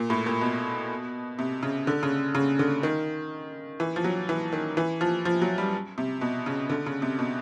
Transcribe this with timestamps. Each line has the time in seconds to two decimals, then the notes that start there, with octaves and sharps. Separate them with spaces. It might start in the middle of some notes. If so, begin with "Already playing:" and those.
Already playing: A#2
0.10 A2
0.26 A#2
0.41 B2
1.39 C3
1.63 C#3
1.87 D3
2.03 C#3
2.35 C#3
2.59 D3
2.83 D#3
3.80 E3
3.96 F3
4.04 F#3
4.29 E3
4.52 D#3
4.77 E3
5.01 F3
5.25 F3
5.42 F#3
5.58 G3
5.98 C3
6.21 B2
6.46 C#3
6.70 D3
6.86 C#3
7.02 C3
7.19 B2